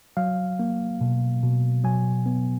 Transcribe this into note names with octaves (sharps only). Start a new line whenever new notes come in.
F#3 F5
A#3
B2
B2
F#3 G#5
B3